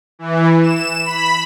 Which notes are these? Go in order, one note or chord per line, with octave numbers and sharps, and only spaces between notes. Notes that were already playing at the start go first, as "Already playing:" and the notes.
E3
E7
B5